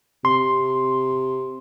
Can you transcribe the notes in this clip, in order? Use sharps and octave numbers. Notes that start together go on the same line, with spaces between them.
C3 C6